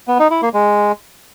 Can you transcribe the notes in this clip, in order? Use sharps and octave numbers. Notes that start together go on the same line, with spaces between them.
B3
D#4
E4
A#3
G#3